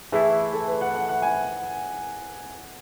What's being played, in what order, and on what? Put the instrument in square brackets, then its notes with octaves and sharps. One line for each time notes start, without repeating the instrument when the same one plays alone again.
[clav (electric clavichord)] E3 A3 E4 [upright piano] G#4
[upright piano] A4
B4
F#5
F#5
F#5
G#5